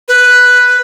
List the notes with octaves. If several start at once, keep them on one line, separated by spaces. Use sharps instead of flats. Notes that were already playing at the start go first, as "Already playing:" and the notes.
B4